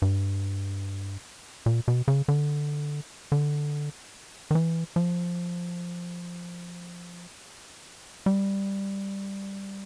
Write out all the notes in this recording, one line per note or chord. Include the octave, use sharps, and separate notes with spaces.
G2
A#2
B2
C#3
D3
D3
D#3
E3
F3
G3